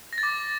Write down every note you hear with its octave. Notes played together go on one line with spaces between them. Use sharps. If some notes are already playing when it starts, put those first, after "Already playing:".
A#6
A6
D6